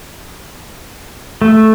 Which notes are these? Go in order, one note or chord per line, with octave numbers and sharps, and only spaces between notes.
A3